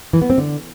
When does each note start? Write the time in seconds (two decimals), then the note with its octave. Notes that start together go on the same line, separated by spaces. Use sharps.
0.13 E3
0.22 B3
0.30 C4
0.38 D3